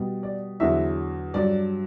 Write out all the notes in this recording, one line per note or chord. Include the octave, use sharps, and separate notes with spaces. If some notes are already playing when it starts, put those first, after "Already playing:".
Already playing: B2 G3
D5
E2 D3 F#3 E5
G2 F#3 D5